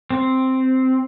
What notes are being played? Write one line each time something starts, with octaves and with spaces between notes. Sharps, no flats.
C4